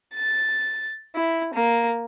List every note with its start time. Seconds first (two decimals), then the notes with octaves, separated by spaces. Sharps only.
0.14 A6
1.14 E4
1.54 A#3